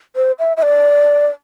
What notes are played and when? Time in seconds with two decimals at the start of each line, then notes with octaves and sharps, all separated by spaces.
0.16 C5
0.39 E5
0.57 E5
0.62 D5